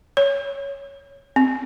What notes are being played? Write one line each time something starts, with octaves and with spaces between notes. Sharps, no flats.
C#5
C4